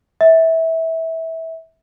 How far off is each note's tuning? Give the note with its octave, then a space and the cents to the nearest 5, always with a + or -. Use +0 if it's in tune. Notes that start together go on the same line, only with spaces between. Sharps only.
E5 -20